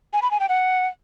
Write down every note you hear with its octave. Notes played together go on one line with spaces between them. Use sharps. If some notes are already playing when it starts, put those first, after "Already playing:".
G#5
B5
G#5
G5
F#5